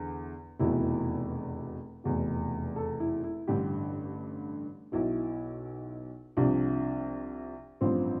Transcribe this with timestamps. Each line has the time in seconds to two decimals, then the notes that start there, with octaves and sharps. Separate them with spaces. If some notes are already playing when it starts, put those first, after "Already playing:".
Already playing: E2 D3
0.59 F1 E2 B2 E4
2.04 F1 E2 B2
2.76 A4
3.00 E4
3.24 E4
3.47 A1 G2 D3 G4
4.92 B1 B2 E4
6.37 C2 C3 F3 D4
7.81 A1 G2 F3 C4